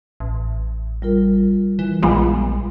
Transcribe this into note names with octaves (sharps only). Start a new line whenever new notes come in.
A1
G3 F4 A#4
E3
A#1 F3 G#3 B3